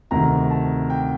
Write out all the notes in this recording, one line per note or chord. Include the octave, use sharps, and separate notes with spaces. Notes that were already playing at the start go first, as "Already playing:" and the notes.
D2 C3 D#3 A#5
A5
G5